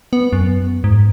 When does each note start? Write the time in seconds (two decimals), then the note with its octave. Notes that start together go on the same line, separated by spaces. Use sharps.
0.13 B3
0.33 F#2
0.84 G#2